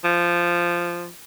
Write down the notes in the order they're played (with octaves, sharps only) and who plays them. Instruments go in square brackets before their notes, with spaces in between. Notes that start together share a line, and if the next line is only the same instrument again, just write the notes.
[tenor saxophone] F3